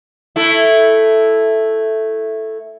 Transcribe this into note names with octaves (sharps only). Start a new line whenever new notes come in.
A3 E4